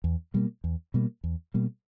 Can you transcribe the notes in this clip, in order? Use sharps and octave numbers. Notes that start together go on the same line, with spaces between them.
E2
B2 G3 A#3
E2
B2 G3 A#3
E2
B2 G3 A#3